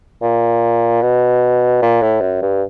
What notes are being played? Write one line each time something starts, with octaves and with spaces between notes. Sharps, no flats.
A#2
B2
A#2
A2
F#2
G2